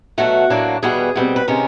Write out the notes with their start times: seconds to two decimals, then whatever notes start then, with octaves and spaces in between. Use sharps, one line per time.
0.18 B2 F#3 A3 F#4
0.50 A2 F#3 A#3 D4
0.82 E2 B2 G3 B3 G#4
1.16 B2 G3 C4
1.36 B4
1.48 C3 D#3 G#3 C#4 A#4